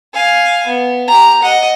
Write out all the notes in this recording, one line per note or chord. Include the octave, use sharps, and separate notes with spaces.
F5 G#5
B3
G4 A#5
D#5 F#5